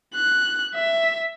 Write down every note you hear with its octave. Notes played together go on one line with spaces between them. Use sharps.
F#6
E5